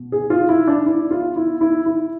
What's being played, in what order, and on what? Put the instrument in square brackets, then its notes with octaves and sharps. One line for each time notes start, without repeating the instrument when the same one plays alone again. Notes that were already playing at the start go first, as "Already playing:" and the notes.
Already playing: [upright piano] B2
G#4
F4
E4
D4
E4
F4
E4
E4
E4